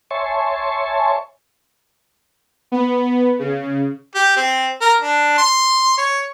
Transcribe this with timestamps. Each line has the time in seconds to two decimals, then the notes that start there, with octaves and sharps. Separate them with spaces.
0.11 C#5 E5 G#5 A5 C6 C#6
2.72 B3
3.39 C#3
4.15 G4
4.37 C4
4.81 A#4
5.00 D4
5.38 C6
5.98 C#5